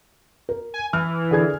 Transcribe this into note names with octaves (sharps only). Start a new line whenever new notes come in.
A#4
G#5
E3 F6
D3 G#4 G#6